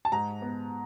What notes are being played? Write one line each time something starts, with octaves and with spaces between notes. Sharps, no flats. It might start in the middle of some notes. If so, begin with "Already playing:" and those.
A5
G#2 A#5
B3